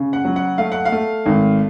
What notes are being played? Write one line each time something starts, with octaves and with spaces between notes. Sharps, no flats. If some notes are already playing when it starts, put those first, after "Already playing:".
Already playing: C#3
F#5
F#3
F#5
A3 F5
F#5
F5
A3
G#1